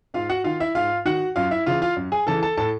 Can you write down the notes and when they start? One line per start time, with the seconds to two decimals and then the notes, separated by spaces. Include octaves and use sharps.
0.14 G#2 F4 F5
0.30 F#4 F#5
0.44 D#3 F4 F5
0.60 E4 E5
0.75 G#2 F4 F5
1.05 D#3 F#4 F#5
1.36 F#2 F4 F5
1.51 E4 E5
1.66 C#3 E3 F4 F5
1.82 F4 F5
1.96 F#2
2.12 G#4 G#5
2.27 C#3 E3 A4 A5
2.43 A4 A5
2.57 A2 A4 A5